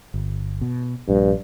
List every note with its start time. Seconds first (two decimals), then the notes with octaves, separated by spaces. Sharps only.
0.14 G1
0.61 B2
1.08 A#1 G2